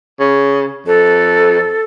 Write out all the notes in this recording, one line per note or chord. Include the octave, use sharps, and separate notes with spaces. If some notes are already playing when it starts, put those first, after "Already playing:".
C#3
F2 A4